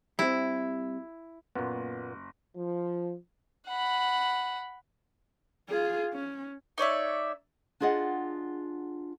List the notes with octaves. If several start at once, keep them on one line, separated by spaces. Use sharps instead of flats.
G3 C4 E4
F#1 A#2 B3
F3
F#5 B5
F4 G#4
C#4
D#4 C#5 D5 E5
D4 F4 G#4 D#5 F#5